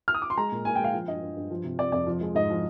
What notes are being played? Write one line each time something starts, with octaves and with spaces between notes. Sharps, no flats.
F6
D#6
D6
C6
G#3 A#5
A#2
A#2 G#5
G5
G#3 F5
F3
G2 D#5
G2
G2
F3
C3
C3 D5
F2 D5
F3
G#3
G#2 D#5
F3